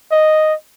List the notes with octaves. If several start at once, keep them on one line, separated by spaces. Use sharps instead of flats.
D#5